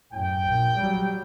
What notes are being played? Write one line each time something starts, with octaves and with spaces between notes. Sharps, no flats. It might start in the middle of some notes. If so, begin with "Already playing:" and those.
F#2 A2 G5
A#1
F#3 G3